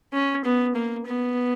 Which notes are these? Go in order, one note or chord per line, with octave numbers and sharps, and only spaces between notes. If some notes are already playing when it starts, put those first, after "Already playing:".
C#4
B3
A#3
B3